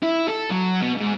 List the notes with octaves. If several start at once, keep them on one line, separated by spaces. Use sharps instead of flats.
E4
A4
F#3
B2
G#2